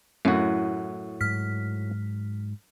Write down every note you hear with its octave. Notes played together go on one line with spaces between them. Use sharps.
F#2 A2 A3 E4 F#4
G#2 F#3 F6 B6